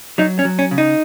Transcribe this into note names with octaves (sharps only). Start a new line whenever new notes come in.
F#3 D#4
C#4
F#3
C#4
C#3
D#4